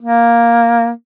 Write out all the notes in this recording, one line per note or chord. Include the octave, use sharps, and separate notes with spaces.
A#3